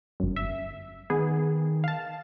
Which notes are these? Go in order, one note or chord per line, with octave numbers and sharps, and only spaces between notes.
G1 F#2
E5
D#3 B3 G#4
F5 A5